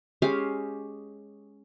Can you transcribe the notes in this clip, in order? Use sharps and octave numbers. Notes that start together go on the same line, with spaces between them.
G#3 C#4 G4 F5